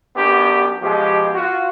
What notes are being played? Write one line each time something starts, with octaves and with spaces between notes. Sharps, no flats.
F#2 B3 D4 G4
B2 F3 G#3 G4
F4 F#4